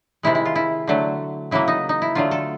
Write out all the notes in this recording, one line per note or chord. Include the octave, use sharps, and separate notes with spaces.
C3 D#3 G#3 E4
E4
F4
E4
D3 F#3 A3
C#3 F#3 A#3 E4
D#4
D#4
E4
D3 F#3 A3 F4
A4